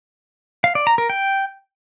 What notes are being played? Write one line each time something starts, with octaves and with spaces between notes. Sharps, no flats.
F5
D5
A#5
A#4
G5